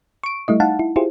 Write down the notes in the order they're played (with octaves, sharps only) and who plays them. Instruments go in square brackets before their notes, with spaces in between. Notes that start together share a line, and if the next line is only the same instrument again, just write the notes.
[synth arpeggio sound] C#6 D7
G3 A3 E4 D#5
D#4 F5 F#5 A5
E4
E4 F4 G4 G#4 C5